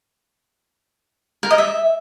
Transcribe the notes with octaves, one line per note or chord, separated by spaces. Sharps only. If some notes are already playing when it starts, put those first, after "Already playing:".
A#4
D#5
E5